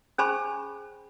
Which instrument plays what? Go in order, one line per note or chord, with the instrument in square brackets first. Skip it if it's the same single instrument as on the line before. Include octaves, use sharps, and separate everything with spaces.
[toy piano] C#4 G#4 C5 G#5 B5 C#6